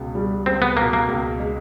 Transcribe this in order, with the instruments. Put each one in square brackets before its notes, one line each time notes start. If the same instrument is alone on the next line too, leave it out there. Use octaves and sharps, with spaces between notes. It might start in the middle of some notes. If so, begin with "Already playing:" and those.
Already playing: [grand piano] C#2 B2
G3
[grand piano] C#2 [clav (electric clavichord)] C4
[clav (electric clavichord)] B3
[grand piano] B2 [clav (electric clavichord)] A#3
[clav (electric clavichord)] A#3
[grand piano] C#2
G#3